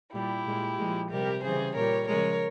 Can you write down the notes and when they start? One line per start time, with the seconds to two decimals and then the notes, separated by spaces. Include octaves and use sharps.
0.14 A#2 G3 E4 G4
0.46 A#2 G#3
0.79 A#2 F3 G#3
1.11 C3 G3 G4 A#4
1.43 C#3 E3 G3 G#4 C5
1.76 A#2 G3 A#4 C#5
2.08 C#3 F3 G#3 A#4 C#5